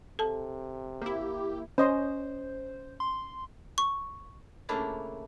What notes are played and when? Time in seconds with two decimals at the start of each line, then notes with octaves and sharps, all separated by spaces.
0.19 C3 A4 A5
1.02 A#3 E4 G4
1.78 C#4 C5 D#5 C6
3.00 C6
3.78 C#6
4.69 C#3 A3 A#3 D4 E4 F4